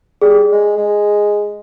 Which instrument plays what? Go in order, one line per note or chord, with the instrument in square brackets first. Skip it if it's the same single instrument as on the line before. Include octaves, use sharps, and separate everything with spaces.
[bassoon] G3 [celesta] G#4
[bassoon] G#3
G#3